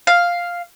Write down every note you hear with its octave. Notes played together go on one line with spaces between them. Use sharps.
F5